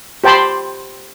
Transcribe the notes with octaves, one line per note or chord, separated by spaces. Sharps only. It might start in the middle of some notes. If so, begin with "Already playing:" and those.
G4 C5 G5 A5 B5 C6